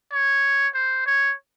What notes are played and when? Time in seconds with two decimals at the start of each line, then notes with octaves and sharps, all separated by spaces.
0.12 C#5
0.74 C5
1.06 C#5